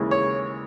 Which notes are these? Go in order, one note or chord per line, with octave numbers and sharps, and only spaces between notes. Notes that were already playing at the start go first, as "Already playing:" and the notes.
Already playing: D#2 C#3 E3 G#3
C#5